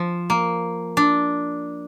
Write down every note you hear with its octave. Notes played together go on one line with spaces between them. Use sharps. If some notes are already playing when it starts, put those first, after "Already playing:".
Already playing: F3
A#3
D4